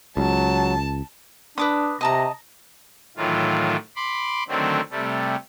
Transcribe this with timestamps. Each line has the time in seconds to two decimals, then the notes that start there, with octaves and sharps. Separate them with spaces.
0.17 C#2 F#3 A5
1.58 D4 B4 D6 D#6
2.01 C3 D#5 A5 A#5
3.17 A2 D#3 E3 F#3 F4
3.96 B5 C6 D6
4.48 D3 D#3 F#3 A3 C4
4.91 C3 G3 A3